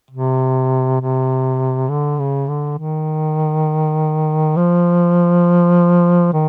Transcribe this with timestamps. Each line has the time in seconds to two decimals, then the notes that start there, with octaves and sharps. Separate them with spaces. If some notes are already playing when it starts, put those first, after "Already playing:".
0.11 C3
1.01 C3
1.89 D3
2.20 C#3
2.49 D3
2.79 D#3
4.57 F3
6.33 D#3